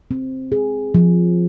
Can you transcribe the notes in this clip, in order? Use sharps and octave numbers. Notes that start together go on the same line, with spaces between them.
C4
G#4
F3